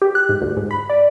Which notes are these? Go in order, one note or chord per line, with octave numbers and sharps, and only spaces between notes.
G4
F#6
G#2
D2
G#2
B5
D5